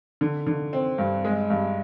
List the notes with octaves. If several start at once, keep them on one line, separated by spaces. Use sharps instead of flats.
D3
D3
C4
G2
G#3
G2